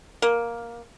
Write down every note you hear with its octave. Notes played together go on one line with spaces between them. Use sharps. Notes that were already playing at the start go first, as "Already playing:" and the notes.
A#3